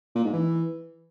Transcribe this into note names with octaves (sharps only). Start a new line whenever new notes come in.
A#2
G#2
E3